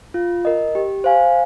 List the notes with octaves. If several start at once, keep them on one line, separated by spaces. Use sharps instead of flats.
F4
A#4 D#5
G4
C5 F5 G#5